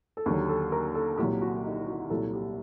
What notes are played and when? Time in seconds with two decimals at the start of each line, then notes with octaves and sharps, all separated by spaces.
0.17 A4
0.26 D#2 D3 F#3 G4
0.49 A4
0.72 A#4
0.95 A4
1.18 C2 A#2 F#3 G4
1.41 F#4
1.64 D#4
1.87 F#4
2.10 C2 A#2 F#3 A4
2.33 G4